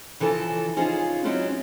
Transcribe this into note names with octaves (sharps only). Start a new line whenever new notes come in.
C#3 E3 F3 A4 A5
C#4 D#4 F4 G#4 C5
F#3 C4 C#4 D#4 E4